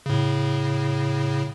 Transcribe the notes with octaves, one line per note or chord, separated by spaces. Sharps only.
A2 C#3